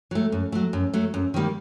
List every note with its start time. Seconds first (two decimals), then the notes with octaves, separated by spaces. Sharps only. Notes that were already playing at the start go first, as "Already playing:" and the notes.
0.11 F#3 A3
0.32 F#2
0.52 F#3 A3
0.73 F#2
0.94 F#3 A3
1.14 F#2
1.34 D#3 G3 A#3